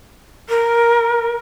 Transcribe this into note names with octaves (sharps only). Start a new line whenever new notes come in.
A#4